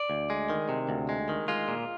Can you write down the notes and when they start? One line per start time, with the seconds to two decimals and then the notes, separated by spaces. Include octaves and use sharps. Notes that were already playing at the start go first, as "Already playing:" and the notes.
Already playing: D5
0.10 D2
0.30 G#3
0.50 D#3
0.69 C3
0.89 D2
1.09 G#3
1.29 D#3
1.48 G#3 F4
1.68 A#2